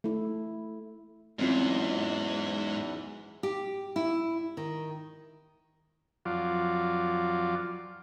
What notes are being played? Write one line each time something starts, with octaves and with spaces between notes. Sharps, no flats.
A3 E4
E2 G#2 E3 F#3 A3 C4 C#4 F4
G4
E4
D#3
F2 F#3 F4 D5